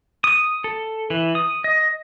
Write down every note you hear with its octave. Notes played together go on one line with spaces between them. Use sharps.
D#6
A4
E3
D#6
D#5